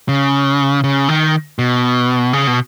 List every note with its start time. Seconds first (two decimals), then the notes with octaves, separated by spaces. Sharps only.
0.09 C#3
0.84 C#3
1.09 D#3
1.59 B2
2.33 C#3
2.47 B2